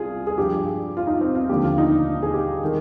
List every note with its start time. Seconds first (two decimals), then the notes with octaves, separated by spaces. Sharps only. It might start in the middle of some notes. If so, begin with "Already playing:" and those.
Already playing: C2 F4 G#4
0.27 G#4
0.38 G2 F3 G4
0.97 F4
1.07 D#4
1.21 C4
1.35 F4
1.49 D#2 D3 F3 G4
1.63 F4
1.78 D#4
2.23 G#4
2.34 G4
2.64 D#3